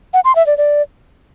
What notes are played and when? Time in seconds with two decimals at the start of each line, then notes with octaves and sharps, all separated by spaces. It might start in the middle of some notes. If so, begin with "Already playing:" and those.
0.14 F#5
0.25 C6
0.36 E5
0.47 D5
0.58 D5